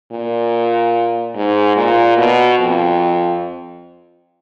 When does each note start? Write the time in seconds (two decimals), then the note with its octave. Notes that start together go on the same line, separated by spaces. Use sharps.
0.12 A#2
1.36 G#2
1.77 A#2
2.18 B2
2.59 F2